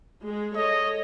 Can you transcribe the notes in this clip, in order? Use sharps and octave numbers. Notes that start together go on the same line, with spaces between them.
G#3 G#4
A4 C#5 D#5